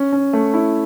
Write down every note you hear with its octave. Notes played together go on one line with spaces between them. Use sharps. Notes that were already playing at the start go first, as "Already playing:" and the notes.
Already playing: C#4
C#4
A3
E4